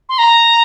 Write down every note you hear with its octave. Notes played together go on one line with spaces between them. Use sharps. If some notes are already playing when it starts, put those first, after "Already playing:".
C6
A#5